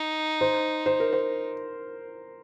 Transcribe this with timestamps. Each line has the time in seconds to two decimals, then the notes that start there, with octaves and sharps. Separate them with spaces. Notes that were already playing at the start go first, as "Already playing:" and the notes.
Already playing: D#4
0.41 C5
0.86 C5
1.00 A#4
1.13 C5